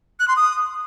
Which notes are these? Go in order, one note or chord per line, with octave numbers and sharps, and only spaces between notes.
F#6
C6
D#6